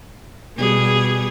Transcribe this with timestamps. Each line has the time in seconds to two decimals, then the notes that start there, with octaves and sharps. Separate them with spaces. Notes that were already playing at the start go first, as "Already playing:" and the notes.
0.56 B2 G3 G#4